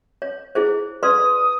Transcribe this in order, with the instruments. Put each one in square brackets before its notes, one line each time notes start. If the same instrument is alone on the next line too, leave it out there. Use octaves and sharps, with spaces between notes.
[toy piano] C#5
E4 G#4 C5
[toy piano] B4 D5 C6 [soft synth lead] D#6